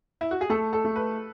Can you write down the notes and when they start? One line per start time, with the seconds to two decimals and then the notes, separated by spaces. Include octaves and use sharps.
0.21 E4
0.31 F#4
0.41 G#4
0.50 A3 A4
0.73 A4
0.85 A3
0.96 B4